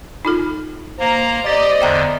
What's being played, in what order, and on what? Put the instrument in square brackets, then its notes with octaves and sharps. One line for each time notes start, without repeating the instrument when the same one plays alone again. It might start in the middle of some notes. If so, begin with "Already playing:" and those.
[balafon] D#4 F4 A4
[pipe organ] A#3 [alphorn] C5 [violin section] A#5
[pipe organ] G4 A6 [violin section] D5 D#5
[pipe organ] E2 D3 [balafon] E5 G5 A#5